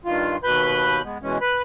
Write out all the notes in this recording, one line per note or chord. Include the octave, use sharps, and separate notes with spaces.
G2 D#3 F4
D#2 B2 B4 B5 G6
G#3 B3
B2 E3 G#3 C#4
B4 B5